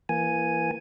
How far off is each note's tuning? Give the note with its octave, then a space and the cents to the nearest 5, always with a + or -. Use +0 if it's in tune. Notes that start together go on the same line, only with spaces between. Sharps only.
E3 +20 A#3 +0 G#5 +0